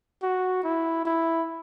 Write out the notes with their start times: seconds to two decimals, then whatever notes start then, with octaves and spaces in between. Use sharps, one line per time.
0.23 F#4
0.64 E4
1.05 E4